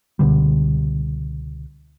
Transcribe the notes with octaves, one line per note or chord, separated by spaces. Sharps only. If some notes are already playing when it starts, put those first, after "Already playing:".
C#2 B2 D3 G3